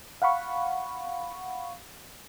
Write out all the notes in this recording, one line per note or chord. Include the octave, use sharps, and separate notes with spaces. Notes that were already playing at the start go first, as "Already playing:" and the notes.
F5 F#5 B5 C#6